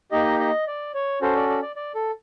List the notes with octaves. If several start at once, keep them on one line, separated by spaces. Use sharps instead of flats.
A#3 D#4 G4 D#5
D#5
D5
C#5
C#4 F#4 A4 C5
D5
D5
D5
D5
A4